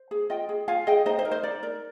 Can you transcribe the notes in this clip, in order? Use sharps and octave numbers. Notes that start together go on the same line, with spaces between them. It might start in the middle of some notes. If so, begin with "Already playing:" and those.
Already playing: C5
G#4
F4 D#5 G5
G#4
F4 F5 G#5
G#4 D#5 G5
D#4 C5 D#5
C5 D#5
A#4
C5 D#5
D#4 D5
A#4 D5